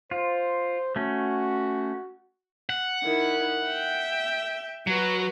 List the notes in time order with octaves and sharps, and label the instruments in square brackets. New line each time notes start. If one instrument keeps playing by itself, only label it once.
[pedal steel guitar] F4 [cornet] C5
[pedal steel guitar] A3 C#4 [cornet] F#4
[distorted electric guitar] F#5
[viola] D#3 E4
E5 G5
[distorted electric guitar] F#3 [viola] F#4 B4